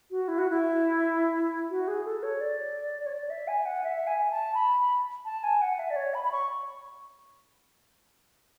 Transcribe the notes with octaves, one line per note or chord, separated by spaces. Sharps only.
F#4
E4
F#4
E4
F#4
G#4
A4
C#5
D5
C#5
D5
E5
G#5
F#5
E5
G#5
A5
B5
A5
G#5
F#5
E5
D5
C#5
B5
B5
C#6